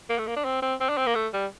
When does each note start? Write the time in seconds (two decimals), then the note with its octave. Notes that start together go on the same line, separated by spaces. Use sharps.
0.09 A#3
0.19 A3
0.27 A#3
0.36 D4
0.45 C4
0.62 C4
0.80 C4
0.89 D4
0.97 C4
1.06 A#3
1.15 A3
1.33 G3